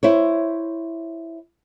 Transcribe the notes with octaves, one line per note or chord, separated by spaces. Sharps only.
E4 C5 C#5